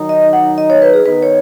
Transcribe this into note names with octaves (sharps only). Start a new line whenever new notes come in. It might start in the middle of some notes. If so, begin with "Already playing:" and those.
Already playing: D#3 F#3 D#4
D#5
F#5
D#5
C#5
B4
G#4
D#3 B3 D#4 B4
C#5